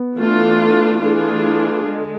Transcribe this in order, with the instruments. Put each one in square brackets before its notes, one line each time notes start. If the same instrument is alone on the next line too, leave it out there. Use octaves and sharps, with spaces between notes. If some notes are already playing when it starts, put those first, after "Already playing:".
Already playing: [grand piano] B3
[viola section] E3 A3 D4 F4
E3 A3 D4 F4 G#4
D3 G#3